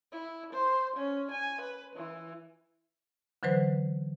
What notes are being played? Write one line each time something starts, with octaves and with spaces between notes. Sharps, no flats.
E4
C5
C#4
G#5
B4
E3
D3 E3 F#3 B4 C5